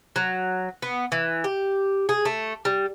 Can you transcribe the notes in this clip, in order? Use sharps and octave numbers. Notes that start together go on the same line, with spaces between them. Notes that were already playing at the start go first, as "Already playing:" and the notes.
F#3
B3
E3
G4
G#4
A3
G3